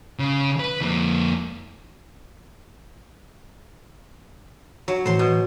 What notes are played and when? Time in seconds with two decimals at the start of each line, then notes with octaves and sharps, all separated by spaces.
0.19 C#3
0.60 B4
0.81 F2 A#3
4.88 F#3
5.06 A2 E3 C5 C6
5.19 B2